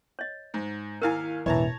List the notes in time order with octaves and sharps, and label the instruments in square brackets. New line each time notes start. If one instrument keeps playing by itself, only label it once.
[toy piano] C#5 D#5
[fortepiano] G#2
[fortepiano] D#2 F5 G#5 [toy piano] E4 A#4
[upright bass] E1 A1 [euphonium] E3 [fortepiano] C#5 A5 A#5